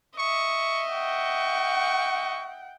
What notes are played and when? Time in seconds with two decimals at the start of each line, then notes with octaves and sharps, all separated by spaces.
0.18 D#5 E5 C#6
0.92 F#5 G5 C#6